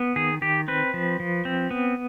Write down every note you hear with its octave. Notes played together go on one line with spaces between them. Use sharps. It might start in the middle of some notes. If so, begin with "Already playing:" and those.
Already playing: B3
D#3 G#4
D#3 G4
C4 B4
F3
F3
C4
B3